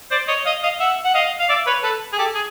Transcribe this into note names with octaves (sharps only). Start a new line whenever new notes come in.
C5 D5
C#5 D#5
D#5 F5
D#5 F5
E5 F#5
F#5
D#5 F5
F5
D5 E5
B4 C#5
A4 B4
G#4
G4 A4
G#4